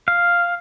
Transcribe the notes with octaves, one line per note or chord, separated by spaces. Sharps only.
F5